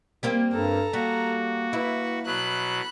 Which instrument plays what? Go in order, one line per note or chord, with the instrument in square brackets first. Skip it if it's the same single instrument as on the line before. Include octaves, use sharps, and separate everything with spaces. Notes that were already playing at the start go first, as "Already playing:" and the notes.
[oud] G3 A#3 C4
[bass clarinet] G2 [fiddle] A4 A#5
[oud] G3 [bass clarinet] A#3 [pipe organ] F#4
[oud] E4 [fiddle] B4
[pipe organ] B2 F#3 [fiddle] B5 F#6